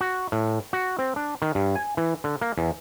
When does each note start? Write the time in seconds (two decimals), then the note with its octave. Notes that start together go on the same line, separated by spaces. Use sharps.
0.01 F#4
0.32 A2
0.73 F#4
0.99 C4
1.16 D4
1.42 D#3
1.55 G2
1.76 G#5
1.97 E3
2.24 D3
2.41 A#3
2.58 E2